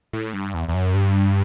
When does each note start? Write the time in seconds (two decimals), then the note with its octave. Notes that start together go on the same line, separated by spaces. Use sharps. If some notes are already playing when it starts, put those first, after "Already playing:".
0.13 A2
0.34 G2
0.54 E2
0.68 E2
0.74 F#2
0.94 G2